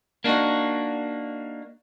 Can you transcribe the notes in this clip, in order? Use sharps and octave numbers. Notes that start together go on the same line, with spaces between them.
A#3 D4 D#4 F#4